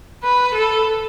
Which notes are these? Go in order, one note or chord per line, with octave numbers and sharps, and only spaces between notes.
B4
A4